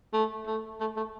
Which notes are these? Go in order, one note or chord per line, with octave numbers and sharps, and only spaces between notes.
A3
A3
A3
A3